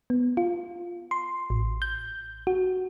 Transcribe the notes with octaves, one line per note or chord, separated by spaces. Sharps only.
B3
F4
C6
A1
G6
F#4